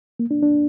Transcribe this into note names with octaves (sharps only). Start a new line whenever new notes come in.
A#3
D4
D4